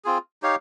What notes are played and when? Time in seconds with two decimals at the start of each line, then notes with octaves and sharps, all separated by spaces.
0.05 C4 F4 G#4
0.42 D#4 G4 C#5 F5